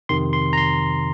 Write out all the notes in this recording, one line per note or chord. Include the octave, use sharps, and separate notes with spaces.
F2 C3 D#3 C6
C6
A#5
C6